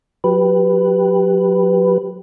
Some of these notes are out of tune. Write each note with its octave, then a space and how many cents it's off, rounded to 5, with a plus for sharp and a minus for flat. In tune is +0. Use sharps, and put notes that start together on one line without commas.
F#3 -30 G4 +0 B4 +0